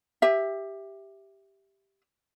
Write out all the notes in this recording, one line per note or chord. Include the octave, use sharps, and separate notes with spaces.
G4 E5